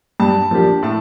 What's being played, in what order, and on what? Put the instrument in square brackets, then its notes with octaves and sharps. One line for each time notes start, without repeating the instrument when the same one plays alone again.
[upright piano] G2 [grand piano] A5
[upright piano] F3 A#3 D4 G4
[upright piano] A2 [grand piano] A5